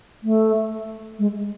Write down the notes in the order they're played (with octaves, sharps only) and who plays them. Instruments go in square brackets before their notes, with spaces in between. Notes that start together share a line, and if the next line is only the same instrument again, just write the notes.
[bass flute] A3
G#3